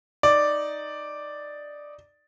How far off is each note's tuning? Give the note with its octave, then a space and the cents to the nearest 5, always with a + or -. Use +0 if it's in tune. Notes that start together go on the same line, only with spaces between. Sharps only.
D#4 +0 D5 +0